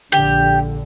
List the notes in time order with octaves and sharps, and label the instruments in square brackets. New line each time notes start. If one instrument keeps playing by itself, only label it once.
[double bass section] A#1 D3 [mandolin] G4